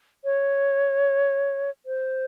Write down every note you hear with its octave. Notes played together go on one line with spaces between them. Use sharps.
C#5
C5